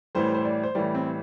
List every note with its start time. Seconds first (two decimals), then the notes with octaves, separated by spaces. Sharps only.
0.15 A1 A2 E3 G3 C5
0.34 C5
0.45 D5
0.63 C5
0.75 A1 A2 E3 G3 D5
0.95 C4